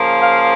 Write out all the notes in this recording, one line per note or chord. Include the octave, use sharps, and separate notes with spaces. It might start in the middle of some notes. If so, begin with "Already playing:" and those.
Already playing: C#3 F3 A#3
F5